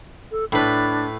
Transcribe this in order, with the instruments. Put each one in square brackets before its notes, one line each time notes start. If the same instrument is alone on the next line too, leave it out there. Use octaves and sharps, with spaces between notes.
[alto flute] A4
[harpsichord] A2 B4 [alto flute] D4